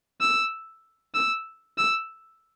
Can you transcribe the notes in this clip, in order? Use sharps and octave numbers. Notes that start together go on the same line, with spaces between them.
E6
E6
E6